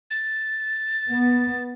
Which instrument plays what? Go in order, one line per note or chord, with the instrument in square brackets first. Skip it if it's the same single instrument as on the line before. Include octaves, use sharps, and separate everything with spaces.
[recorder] A6
[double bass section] B3